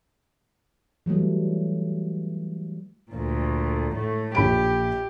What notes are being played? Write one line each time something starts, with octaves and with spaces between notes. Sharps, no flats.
E3 F#3 G3 A3
D2 A#2
A2 A3
A#1 G4 B5 D7